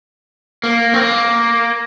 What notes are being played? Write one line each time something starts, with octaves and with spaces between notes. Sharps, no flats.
A#3
C4
A#3